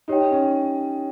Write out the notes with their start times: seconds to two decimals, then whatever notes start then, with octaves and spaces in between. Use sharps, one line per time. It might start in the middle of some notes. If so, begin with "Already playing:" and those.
0.08 D#4 G4 C#5 G5
0.31 C#4